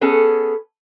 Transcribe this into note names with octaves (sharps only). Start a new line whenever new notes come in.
B3 C#4 G#4 A4